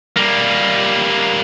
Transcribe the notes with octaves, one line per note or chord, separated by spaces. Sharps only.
G3 A#3